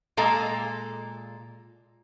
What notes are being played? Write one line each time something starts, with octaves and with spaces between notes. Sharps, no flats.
A#2 G#3 A4 F5 A#5